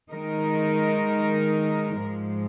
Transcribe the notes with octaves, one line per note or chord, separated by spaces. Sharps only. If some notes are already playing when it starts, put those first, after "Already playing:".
D#3 G#3 D#4 A#4
G#2 F3 G#3